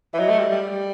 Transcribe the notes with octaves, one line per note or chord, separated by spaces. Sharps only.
E3 E5
F#3 D#5
A3
G3
G3